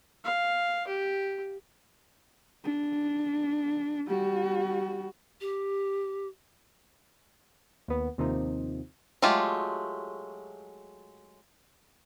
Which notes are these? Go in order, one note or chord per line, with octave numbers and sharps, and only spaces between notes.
F5
G4
D4
G3 F#4
G4
D#2 B3
D#2 C3 D#3 F3 D#4
F#3 G#3 A3 F4 G4